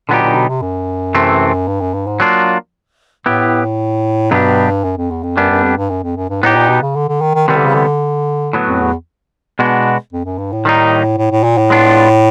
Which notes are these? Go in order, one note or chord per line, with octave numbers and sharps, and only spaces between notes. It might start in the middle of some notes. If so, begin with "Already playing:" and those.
A#2 D3 F#3 B3 D#4 G4
A#2
B2
C3
F#2
C3 E3 A3 C4
G2
F#2
G2
G#2
F#3 A#3 D4 F4
A2 B3 E4 G4
G2 B2 F#3 B3 D4 G4
F#2
F2
E2
F2
F#2 G3 B3 D4
F#2
F2
G2
F#2
F2
F#2
G2
A2 B3 D#4 G4
A#2
B2
C#3
D3
D3
D#3
D#3
C3 D#3 E3 G3 B3
D3
C#3
D3
A2 F#3 B3
F2
E2
B2 G#3 B3 D4 F#4
F2
F#2
G2
A2
D#3 G3 A#3 D#4
A2
A2
A#2
A2
G#3 B3 D4 F4